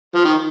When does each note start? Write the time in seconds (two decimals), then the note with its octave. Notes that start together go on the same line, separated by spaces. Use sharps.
0.15 F3
0.25 D#3